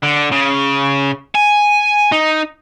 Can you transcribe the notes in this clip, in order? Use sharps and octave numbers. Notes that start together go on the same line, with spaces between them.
D3
C#3
G#5
D#4